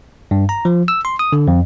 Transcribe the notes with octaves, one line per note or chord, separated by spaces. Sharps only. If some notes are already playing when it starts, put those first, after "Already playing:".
G2
A#5
F3
E6
C6
D#6
D3
F2